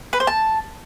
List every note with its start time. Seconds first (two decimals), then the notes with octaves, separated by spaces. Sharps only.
0.13 B4
0.20 C5
0.27 A5